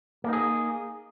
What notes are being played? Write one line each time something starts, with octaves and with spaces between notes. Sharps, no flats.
A#3 D#4 G#4